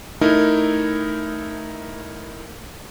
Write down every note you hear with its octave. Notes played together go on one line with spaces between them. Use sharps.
A3 D#4 E4 A#4